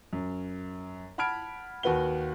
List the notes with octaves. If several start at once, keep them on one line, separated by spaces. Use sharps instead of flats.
F#2
F#5 A5 B5 F6 G#6 D7
D#2 F#4 B4 F#5 G7